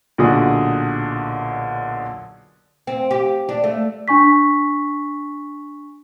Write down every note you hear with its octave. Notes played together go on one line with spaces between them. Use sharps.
B1 A#2 D3 F#4 G#4 D#6
C4
G4
D4
A3
D4 G#5 C#6 B6